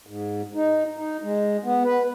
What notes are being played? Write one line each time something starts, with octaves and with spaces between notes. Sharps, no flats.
G#2
D#4
D#4
G#3
B3
B4